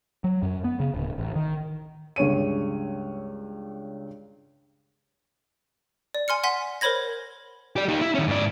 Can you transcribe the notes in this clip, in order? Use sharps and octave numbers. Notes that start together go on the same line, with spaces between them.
F#3
F#2
B3
C#3
D1
A1
D#3
C#2 G2 C#5 D#7
D5
G#5 C6 F6 C#7
F#5 G#5 C6 B6
A#4 C5 C#5 B5 G#6 A#6
G4 D5
D#4 G4
E4
D#3 C#4
G#2 D5